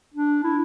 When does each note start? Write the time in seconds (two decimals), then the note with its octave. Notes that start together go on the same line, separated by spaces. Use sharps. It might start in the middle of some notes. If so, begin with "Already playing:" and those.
0.14 D4
0.44 E4